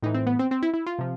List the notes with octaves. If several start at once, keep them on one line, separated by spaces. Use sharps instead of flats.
A2 E3 D#4
C4
B3
C4
C4
E4
E4
F4
C3 F3